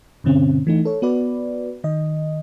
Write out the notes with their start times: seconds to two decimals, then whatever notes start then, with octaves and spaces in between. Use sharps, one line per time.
0.24 G2 B2 D3 C4 C#4
0.67 E3 A3 D#4
0.85 A4 C#5
1.02 B3 F#4 B4 D5
1.84 D#3 D#5